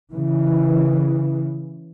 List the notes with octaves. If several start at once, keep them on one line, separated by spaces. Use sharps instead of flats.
C#3 E3